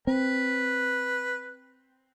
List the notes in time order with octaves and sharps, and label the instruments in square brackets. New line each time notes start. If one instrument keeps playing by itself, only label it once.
[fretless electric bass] C4 [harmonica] B4